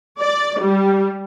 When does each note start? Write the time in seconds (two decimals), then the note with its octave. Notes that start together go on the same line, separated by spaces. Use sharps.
0.18 D5
0.59 G3